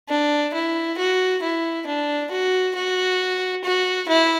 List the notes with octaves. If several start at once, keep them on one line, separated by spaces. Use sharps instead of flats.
D4
E4
F#4
E4
D4
F#4
F#4
F#4
E4